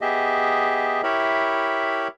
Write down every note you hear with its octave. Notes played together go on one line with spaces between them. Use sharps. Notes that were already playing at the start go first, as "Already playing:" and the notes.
B3 G4 G#4 D#5 E5
E4 G4 A#4 C#5 E5 B5